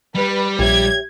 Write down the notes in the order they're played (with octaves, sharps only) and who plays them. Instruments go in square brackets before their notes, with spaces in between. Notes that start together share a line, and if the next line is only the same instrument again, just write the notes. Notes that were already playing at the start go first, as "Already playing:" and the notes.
[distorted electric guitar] G3 [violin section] B4
[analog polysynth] A#1 [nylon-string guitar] G4 C#5 E5 [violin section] G#6